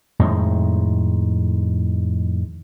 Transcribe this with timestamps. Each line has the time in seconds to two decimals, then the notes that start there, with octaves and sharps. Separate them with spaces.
0.19 F2 A2 D#3 G#3